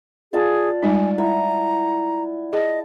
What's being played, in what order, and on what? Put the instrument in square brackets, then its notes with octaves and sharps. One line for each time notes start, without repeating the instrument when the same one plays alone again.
[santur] F4 D5 A5 [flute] G#4
[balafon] G3 G#3 D#4 [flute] G#5
[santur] E4 E5 F#5 [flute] A#5
[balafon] G#4 [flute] D#5 [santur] A5